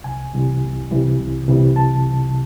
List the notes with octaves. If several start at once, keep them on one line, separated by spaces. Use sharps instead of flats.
C2 G#5
C3 E3 G3
C2
C3 E3 G3
C2
C3 E3 G3
A5